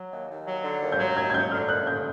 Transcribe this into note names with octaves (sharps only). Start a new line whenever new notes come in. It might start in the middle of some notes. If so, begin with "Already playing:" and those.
Already playing: F#3
D#2
D#2
F#3
D3
D#2
G6
F#3 G#6
D#2 G#6
G#6
F#3 G6
D3 F6
D#2 F#6
D3 G6